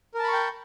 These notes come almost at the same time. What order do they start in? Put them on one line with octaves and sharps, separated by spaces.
A#4 A5 B5 C#6 G5